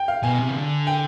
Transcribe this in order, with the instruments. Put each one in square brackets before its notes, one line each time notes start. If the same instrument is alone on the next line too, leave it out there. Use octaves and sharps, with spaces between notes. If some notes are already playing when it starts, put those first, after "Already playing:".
Already playing: [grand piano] G5
F5
[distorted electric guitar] B2 [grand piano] G#5
[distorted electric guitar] C3
D#3
D3
[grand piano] G5